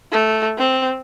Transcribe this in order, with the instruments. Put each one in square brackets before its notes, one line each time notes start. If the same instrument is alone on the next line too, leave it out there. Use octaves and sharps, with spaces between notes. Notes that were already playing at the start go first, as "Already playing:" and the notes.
[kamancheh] A3
C4